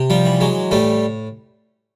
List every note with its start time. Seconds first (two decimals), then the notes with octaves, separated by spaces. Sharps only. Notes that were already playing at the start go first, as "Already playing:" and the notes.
Already playing: C3
0.10 F3 G3
0.25 E3
0.41 F#3 G#3
0.71 A2 G3 A3